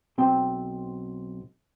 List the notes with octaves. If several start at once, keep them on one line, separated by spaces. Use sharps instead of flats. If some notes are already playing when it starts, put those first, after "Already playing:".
B1 C4 G5